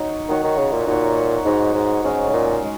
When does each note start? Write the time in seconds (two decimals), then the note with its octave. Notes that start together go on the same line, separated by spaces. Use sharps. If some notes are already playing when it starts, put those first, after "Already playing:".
Already playing: D#4 F#4 C#5
0.29 D#3 D#4 F#4 C#5
0.44 D#3
0.58 C#3
0.73 A#2
0.87 A#2 D#4 F#4 C#5
1.45 G#2 D#4 F#4 C#5
1.74 G#2
2.04 G#2 G#3 C#4 G#4
2.29 C#3
2.33 A#2
2.63 G#3